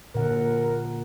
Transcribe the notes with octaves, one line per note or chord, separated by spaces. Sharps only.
A#2 D3 A#4 F#5